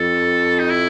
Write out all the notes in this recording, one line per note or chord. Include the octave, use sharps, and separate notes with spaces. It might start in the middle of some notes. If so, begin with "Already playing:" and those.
Already playing: F2 A4
D#4
E4